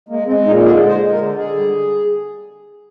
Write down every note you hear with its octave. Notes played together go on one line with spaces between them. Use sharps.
G#3 A#3
G#3 C4
A#2 D#4
D3 G#4
G#3
C5
G#3
A#4
D3
D3 G#4
G3